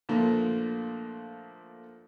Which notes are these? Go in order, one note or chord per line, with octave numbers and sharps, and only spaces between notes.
A#2 D3 F3 A3 A#3